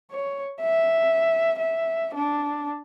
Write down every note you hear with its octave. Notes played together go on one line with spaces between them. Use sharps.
C#5
E5
E5
D4